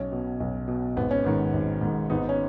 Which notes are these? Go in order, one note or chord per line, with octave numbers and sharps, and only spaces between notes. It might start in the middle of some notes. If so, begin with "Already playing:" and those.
Already playing: B1 C#4
B2
B1
B2
G#1 B3
C#4
G#2 D#3 B3
G#1
G#2 D#3
G#1 B3 D#4
C#4